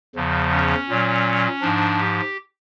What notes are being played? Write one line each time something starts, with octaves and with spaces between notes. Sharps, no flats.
E2 C#3 F3
C#4
A#2 F#3
G#2 F3 D4
G4